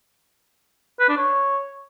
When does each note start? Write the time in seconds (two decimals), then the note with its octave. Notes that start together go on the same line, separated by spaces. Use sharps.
1.00 B4
1.09 D4
1.17 C#5